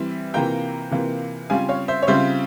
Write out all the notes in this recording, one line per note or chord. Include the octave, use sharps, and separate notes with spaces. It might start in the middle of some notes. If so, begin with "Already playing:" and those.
Already playing: E3 G3 C4 E4
C3 E3 A#3 F4 G5 A#5
C3 E3 A#3 F4
C#3 G3 C4 F4 F5 G#5
C#5 F5
C5 E5
C#5
C#3 G3 C4 F4 C5 E5